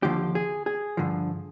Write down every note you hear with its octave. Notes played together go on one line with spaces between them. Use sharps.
D#2 D3 F3 G4
G#4
G#4
G2 D3 F3